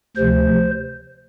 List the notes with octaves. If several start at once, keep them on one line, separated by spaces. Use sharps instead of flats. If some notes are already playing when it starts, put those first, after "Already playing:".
D2 C3 F3 C5